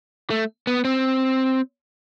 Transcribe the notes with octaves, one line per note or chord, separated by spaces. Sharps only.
A3
B3
C4